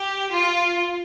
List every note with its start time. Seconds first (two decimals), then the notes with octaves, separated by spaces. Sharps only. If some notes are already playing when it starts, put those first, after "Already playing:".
Already playing: G4
0.31 F4